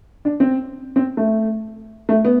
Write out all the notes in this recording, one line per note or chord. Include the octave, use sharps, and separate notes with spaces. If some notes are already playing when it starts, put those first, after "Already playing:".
D4
C4
C4
A3
A3
B3